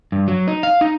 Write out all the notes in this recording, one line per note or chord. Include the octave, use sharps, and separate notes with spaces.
G2
F#3
D#4
F5
D#4